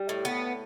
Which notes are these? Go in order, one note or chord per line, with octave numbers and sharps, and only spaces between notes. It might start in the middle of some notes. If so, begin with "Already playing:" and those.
Already playing: G3
A2
B3